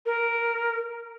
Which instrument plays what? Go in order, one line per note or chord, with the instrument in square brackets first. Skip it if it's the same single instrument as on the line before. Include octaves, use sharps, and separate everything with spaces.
[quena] A#4